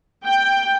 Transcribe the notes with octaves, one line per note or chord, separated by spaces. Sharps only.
G5